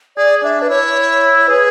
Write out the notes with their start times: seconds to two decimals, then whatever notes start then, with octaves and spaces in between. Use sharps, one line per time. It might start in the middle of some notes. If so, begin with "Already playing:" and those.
0.17 G#4 D5
0.43 D4 E5
0.61 D4 B4
0.70 E4 C#5
1.38 C#5
1.48 G#4 B4